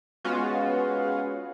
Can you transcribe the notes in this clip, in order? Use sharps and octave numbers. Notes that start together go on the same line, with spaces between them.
G#3 B3 C#4 F4 F#4